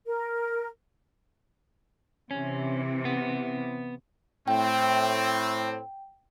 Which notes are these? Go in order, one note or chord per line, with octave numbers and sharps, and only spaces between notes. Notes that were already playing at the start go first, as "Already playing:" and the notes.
A#4
C3 E3 C#4
B3
A2 C4 G5